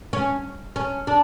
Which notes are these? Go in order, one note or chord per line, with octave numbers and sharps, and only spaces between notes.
C#4
C#4
D4